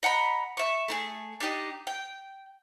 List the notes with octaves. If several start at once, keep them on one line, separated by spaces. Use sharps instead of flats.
D#5 F#5 A#5 B5
E5 C#6
A3 D#4 G#4
D4 D#4 G4 D#5
G5